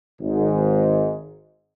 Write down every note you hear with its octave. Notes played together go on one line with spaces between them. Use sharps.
G#1 G#2